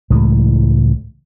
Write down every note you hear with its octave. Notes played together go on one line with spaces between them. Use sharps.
C#2 A2 E3 G#3